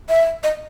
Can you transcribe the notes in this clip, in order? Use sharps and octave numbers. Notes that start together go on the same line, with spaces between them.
E5
D#5